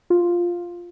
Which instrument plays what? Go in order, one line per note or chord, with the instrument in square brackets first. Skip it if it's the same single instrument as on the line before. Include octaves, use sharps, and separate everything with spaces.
[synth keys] F4